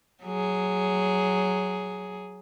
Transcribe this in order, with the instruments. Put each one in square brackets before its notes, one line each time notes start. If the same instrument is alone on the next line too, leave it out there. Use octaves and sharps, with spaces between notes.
[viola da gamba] F#3 G#4